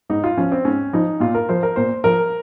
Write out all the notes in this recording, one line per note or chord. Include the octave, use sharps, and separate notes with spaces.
G#2 D#4
F4
F3 C#4
C4
G#2 C#4
F3 D#4
A#2 F4
A#4
F3 C5
A#4
A#2 C5
F3 A#4